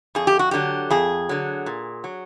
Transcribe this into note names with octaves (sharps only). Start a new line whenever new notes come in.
F2 G#4
G4
F#4
D3 F#3 G4
F2 G#4
D3 F#3
A#2
F#3